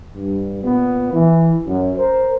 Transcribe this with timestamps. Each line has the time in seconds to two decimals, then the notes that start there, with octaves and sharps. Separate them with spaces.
0.15 G2
0.64 A#2 B3
1.12 E3
1.66 F#2
1.97 A#4 C5